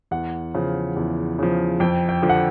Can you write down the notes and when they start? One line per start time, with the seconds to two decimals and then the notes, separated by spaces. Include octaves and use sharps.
0.11 E2 F#5
0.54 C#3 F3
0.96 E2
1.39 C#3 F3
1.80 F2 G5
2.09 G5
2.22 D3 F3
2.29 F#5